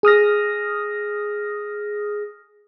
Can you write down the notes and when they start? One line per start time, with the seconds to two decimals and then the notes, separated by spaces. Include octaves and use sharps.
0.03 G#4 D#6 F6 A#6